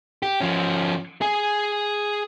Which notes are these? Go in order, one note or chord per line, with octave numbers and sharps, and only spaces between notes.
G4
F3 C#4
G#4 G#5